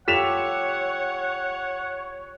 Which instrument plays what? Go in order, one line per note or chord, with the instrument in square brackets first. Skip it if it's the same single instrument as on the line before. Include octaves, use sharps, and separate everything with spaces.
[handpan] F4 G4 A4 [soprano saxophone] C#5 [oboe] F#5 [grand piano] B6 E7 F7